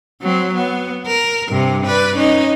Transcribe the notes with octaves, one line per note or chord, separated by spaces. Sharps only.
F#3 C4
B3
A#4
G2 C3
B4 D5
C#4 D#4